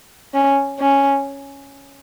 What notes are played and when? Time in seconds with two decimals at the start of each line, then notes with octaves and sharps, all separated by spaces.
0.34 C#4
0.79 C#4